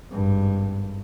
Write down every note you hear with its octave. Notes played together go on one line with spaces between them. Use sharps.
G#1 G2